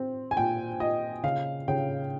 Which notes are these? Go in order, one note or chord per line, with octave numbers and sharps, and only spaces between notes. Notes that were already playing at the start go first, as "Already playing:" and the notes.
Already playing: C4
G#5
A#2 G5
A#2 D#5
C#3 F5
C#3 G5